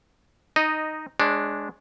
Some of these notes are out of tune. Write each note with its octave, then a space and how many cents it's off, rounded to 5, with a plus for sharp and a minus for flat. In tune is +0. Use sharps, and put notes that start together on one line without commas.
D#4 +0 D#5 -10
G#3 +0 D4 -5 C#5 -40